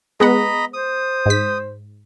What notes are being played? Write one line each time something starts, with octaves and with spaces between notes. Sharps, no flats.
G#3 B3 D#5 F#5 A#5 B5
C5 D#6
G#2 B6